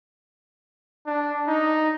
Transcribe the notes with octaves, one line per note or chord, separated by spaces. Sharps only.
D4
D#4